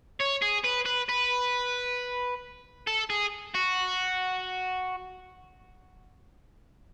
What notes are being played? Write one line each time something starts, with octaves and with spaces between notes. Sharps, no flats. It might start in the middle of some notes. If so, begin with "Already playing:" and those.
C#5
G#4
B4
B4
B4
A4
G#4
F#4